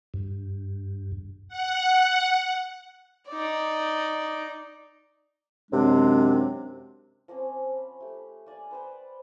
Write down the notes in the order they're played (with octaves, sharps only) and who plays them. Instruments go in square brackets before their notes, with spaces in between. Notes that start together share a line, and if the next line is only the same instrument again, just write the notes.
[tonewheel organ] G2
[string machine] F#5
[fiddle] D#4 D5
[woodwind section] F#2 C3 G#3 C4 D4
[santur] F3 A#3 C4 C#4
B5
A3 G4
A#3 D5 G#5
B4 C5 G5